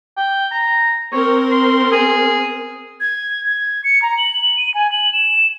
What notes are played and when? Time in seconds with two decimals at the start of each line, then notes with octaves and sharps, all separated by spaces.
0.17 G5
0.52 A#5
1.12 C4 A#4 C#5
1.52 C6
1.92 G#4
3.00 G#6
3.47 G#6
3.84 C#7
4.02 A#5
4.18 F#7
4.57 D#7
4.74 G#5
4.92 F#7
5.13 E7